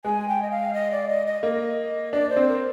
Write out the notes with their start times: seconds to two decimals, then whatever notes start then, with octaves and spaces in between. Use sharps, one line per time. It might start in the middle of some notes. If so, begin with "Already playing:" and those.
0.05 G#3 G#5
0.28 G5
0.42 D#5
0.51 F5
0.74 D#5
0.91 D5
1.09 D#5
1.27 D#5
1.43 A#3 D#5
2.13 D4 D5
2.30 C5
2.37 C4
2.48 A#4